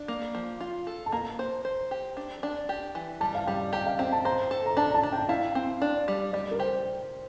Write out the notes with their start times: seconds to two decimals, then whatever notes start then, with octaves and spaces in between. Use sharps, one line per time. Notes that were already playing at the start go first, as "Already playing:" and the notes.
Already playing: D4
0.08 A#3
0.35 F3
0.60 F4
0.87 A4
1.06 A5
1.12 A#3 A#5
1.39 C5
1.65 C5
1.91 G4
2.17 D4
2.43 D4
2.69 G4
2.95 E3
3.20 G3 A5
3.35 F5
3.46 G3 G5
3.73 G4 G5
3.87 F5
3.99 C4 G5
4.12 A5
4.25 C5 A#5
4.51 A4
4.66 A#5
4.77 D4 A5
4.90 A#5
4.94 A5
5.03 D4
5.12 G5
5.29 E4 F5
5.55 C4
5.82 D4
6.08 G3
6.33 G3 D5
6.51 A#4
6.59 G4 C5